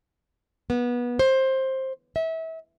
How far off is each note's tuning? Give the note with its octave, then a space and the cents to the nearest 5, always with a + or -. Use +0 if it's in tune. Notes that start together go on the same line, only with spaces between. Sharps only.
B3 -25
C5 +15
E5 -30